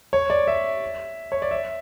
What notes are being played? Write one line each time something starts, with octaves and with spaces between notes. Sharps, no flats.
C#5
D5
E5
C#5
D5
E5